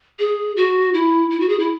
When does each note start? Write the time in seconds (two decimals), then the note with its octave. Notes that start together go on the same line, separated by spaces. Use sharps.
0.19 G#4
0.56 F#4
0.94 E4
1.30 E4
1.40 F#4
1.49 G#4
1.59 E4